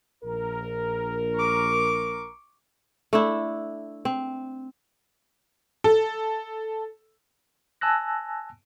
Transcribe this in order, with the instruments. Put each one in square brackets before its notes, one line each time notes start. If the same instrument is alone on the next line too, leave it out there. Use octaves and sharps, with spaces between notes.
[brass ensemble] A#1 A#4
[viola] C#6 D6
[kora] A3 D4 E4
C4
[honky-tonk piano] A4
[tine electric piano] G#5 A5 E6 F#6 A#6